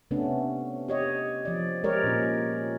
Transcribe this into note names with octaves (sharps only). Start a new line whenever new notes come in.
C3 A3 B3 C#4 D4
G4 C#5 D#5
F3 D5
G#3 G4 A#4 C#5 D5
A#2 C#4